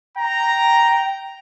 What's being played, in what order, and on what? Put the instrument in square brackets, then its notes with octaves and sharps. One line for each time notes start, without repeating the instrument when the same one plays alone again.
[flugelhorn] G5 [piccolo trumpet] A#5